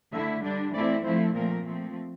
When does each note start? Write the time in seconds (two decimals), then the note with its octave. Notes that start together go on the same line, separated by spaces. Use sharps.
0.12 D3 A3 E4 E5
0.43 D3 G3 D4 D5
0.74 E3 A3 C4 E4 D5
1.04 F3 A3 C4 E4 C5
1.34 A#2 F3 A3 C4 A#4
1.65 F3 A3 C4